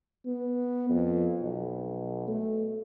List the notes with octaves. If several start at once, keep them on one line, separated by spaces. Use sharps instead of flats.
B3
F2
B1
A3